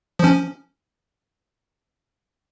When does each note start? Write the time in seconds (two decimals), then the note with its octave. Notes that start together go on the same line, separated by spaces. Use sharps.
0.19 F3 C#4